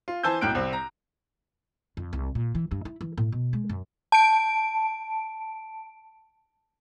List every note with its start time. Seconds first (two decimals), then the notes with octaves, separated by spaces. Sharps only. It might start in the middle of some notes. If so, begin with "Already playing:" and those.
0.08 F4
0.23 E3 C5 G#5 A5 E6 G6
0.41 B1 A2 G5 F#6 D7
0.55 C2 C4
0.73 A#5
1.97 F2
2.13 C2
2.35 A#2
2.55 E3
2.71 G2
2.85 E4
3.01 E3
3.18 A2
3.32 B2
3.53 G#3
3.70 F#2
4.12 A5 D7